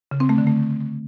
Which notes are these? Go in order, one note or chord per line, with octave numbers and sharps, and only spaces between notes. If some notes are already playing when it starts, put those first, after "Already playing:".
C#3
C4
A3
D3
A3